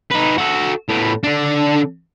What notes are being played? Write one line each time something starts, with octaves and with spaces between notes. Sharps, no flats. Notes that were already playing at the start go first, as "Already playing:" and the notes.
D#4 B4
F#4 A4
A2 B3
D3 D4